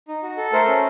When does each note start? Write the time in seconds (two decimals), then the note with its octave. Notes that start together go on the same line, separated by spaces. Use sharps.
0.08 D#4
0.23 F#4
0.38 A4
0.53 A3 A#4 C5
0.68 C#4